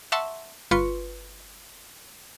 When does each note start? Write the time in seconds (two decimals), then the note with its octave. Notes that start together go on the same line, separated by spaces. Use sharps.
0.12 E5 F#5 A5 C6 C#6 E6
0.71 G1 F4 B4 C6 C#6 C#7